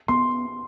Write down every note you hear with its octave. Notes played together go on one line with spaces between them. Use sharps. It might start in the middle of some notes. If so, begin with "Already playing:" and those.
B3 C6